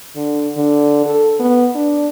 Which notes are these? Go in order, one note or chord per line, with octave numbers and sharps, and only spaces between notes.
D3
D3
A4
B3
D4